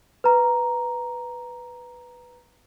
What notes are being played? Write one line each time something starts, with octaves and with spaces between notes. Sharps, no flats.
B4 A#5